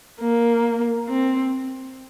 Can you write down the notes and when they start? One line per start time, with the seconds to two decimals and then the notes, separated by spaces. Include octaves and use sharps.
0.21 A#3
1.09 C4